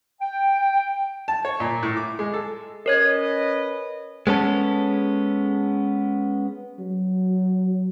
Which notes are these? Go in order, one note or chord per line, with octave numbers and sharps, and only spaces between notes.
G5
A5
C#5
A#2
A2
D6
G#3
A4
C#4 A#4 B4 C#5 D#5 G#6
G#3 B3 C#4 A4
F#3